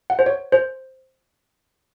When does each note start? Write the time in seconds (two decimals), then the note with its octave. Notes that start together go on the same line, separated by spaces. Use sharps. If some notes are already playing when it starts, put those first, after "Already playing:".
0.10 F#5
0.19 C5
0.26 C#5
0.52 C5